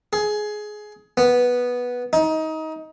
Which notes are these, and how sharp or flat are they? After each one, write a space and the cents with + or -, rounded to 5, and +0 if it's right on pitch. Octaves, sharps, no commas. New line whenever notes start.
G#4 +15
B3 -5
D#4 +25